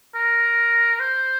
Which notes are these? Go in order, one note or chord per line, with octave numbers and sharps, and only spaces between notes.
A#4
C5